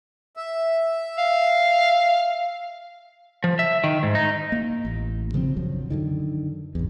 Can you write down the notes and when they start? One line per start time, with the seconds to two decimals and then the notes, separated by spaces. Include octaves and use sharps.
0.37 E5
1.19 F5
3.44 F3
3.59 E5
3.84 D#3
4.03 G#2
4.15 D#4
4.52 A#3
4.85 A1
5.34 C#3 F3 G3 C4
5.57 A#1 F#2 F3 F#3
5.90 F#2 D3 D#3
6.75 G#1 E2